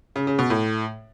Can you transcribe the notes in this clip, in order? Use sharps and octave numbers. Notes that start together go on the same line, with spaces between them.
C#3
C#3
B2
A2